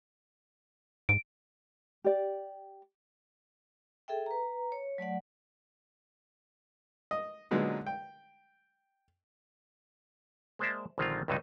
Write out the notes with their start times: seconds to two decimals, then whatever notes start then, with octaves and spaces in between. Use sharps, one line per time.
1.09 G#2 D7
2.04 G4 D5
4.08 G#4 A4 E5 G5
4.26 B4 A#5
4.72 C#5
4.98 F#3 A3 D5 F#5
7.11 D#5
7.51 A#2 D3 F#3 G#3 B3 D#4
7.87 G5
10.59 G#3 A#3 C5 D5 E5 A5
10.98 A#1 D3 D#3 G#3 C4 F4
11.28 C#2 G2 C3 F#3 D4 D#4